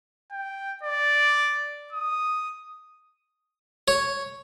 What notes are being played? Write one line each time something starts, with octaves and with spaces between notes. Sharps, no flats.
G5
D5
D#6
C#5